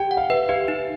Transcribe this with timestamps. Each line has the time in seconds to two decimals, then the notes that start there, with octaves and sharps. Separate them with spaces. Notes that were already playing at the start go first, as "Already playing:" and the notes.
Already playing: G4 G5
0.11 F#5
0.17 F5
0.30 B4 E5
0.49 G4 F5
0.68 D#4